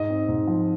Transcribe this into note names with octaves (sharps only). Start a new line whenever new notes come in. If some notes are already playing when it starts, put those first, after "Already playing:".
Already playing: G#2 D#5
C4
G#2
F3